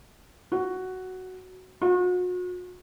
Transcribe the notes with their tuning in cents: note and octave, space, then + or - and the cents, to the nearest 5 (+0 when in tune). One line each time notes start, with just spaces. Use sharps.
F#4 +5
F#4 -40